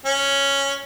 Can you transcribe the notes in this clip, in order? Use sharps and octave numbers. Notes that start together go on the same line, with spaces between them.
C#4